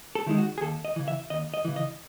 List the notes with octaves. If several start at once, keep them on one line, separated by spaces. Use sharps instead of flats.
A4
D#3 G#3 D#4 E4
F#4
G#4
D#2 A4
D#5
C#3 E3
E5
D#2 D#5
D#5
C#3 E3
D#5